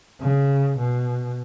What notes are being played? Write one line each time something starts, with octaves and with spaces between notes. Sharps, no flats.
C#3
B2